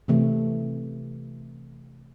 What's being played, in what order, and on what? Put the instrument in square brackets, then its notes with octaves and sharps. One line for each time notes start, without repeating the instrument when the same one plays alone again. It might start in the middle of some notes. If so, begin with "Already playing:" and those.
[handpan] C3 E3 A3